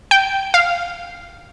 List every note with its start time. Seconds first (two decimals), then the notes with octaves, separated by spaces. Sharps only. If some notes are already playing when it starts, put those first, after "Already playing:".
0.11 G5
0.54 F5